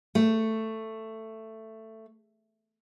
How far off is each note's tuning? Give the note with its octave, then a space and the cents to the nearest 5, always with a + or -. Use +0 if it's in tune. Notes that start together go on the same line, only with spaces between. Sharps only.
A3 +10